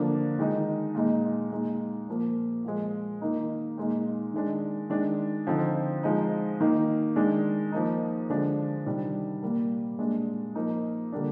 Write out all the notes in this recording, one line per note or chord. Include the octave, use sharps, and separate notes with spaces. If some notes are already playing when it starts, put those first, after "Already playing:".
Already playing: D3 F3 A#3 D4
D#3 G#3 D#4
A#2 G#3 D#4
A#2 G#3 D#4
A#2 F3 A#3
A#2 F3 G#3
D#3 A#3 D#4
A#2 G#3 D#4
D#3 G#3 D4
D#3 G#3 D4
D3 F3 C4 D#4
F3 G#3 D#4
D#3 A#3 D#4
D#3 G#3 D4
F3 A#3 D#4
D3 F3 G#3 D4
C3 D#3 G3 D4
A#2 G3 A#3
A#2 G#3 D4
F3 A#3 D#4
D3 G3 A#3 D4